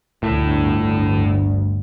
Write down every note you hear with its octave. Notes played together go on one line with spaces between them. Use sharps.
G1 D2 A2